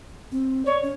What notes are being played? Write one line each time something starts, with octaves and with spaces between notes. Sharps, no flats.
C4
C#5 D5
C#4